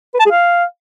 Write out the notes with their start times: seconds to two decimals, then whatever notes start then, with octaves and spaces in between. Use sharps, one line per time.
0.14 B4
0.20 A5
0.25 G#4
0.31 F5